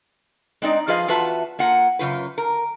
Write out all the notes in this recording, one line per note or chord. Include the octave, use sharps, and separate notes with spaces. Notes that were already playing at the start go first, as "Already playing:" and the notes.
G#3 C4 D#4 D5
F3 F4 G#4 B4 D#5 F5
E2 F4 F#4 B4 E5 A5
A#3 F4 F#5
F#2 C#3 F4 B4
A#4